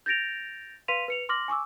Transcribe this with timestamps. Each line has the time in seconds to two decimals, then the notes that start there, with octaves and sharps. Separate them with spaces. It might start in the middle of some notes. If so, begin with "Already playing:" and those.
0.06 G6 A6 A#6 D7 F7
0.88 B4 F5 C6 B6 D#7 F7
1.08 B4 C#7 F7
1.29 C6 D6 F6 A#6 F#7
1.48 G#5 C#6 D6 E6